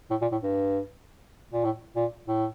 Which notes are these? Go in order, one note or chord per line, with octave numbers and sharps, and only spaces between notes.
A2
A#2
A2
G2
A#2
A2
A#2
A2